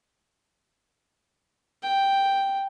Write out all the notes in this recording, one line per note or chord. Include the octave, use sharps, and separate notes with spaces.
G5